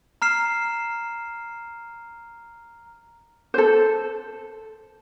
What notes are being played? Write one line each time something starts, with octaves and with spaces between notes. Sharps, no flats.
A#5 F6 C7 E7
A4 C5